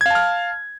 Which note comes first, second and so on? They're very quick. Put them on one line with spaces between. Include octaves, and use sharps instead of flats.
G#6 F5 A5 F6